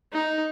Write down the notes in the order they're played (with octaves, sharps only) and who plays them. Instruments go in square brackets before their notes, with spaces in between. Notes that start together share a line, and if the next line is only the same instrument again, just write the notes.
[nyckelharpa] D#4